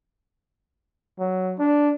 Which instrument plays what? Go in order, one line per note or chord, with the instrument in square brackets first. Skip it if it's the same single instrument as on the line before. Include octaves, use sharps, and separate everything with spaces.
[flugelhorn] F#3
D4